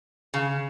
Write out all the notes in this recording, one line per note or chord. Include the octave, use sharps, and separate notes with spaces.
C#3